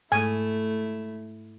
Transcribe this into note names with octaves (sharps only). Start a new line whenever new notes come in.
G#2 A3 E4 G#5